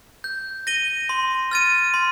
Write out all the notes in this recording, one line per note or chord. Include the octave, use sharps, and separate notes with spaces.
G6
A#6 D#7 G7
C6
F6 A6 D#7
C6